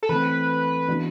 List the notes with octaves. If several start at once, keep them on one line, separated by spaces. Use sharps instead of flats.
A4
E3 A3 C4 B4
E3 B3 D4 F#4